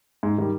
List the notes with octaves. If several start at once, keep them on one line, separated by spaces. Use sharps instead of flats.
G#2
D#3 G3